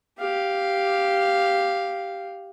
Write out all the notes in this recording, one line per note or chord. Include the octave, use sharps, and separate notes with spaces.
G4 F5